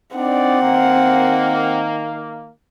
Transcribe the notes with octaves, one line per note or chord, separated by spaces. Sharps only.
C4 D4 D#4 D5 F#5
D#3 A#3